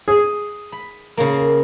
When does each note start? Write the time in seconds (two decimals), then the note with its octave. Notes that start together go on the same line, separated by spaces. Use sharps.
0.08 G#4
0.72 B5
1.17 C#3 A#3